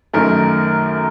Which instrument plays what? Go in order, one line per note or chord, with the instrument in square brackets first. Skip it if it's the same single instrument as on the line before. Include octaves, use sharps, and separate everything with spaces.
[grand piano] F#2 D#3 A3 A#4